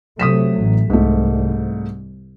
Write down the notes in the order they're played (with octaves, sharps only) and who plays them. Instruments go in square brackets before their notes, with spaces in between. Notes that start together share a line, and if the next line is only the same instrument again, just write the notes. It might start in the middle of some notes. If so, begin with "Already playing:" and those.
[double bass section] C3 F#3 A3 [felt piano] D#6 B6 E7
[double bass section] A1
[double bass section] C2 [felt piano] G#2 A3